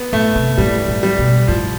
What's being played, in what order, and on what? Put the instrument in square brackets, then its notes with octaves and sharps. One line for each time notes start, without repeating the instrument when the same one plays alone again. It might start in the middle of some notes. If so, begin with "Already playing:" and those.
Already playing: [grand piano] B3
[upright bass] A2 [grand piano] A3
[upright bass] C3
[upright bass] A2 [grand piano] G3
[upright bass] A2
[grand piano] G3
[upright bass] B2
[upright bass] A2 [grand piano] F3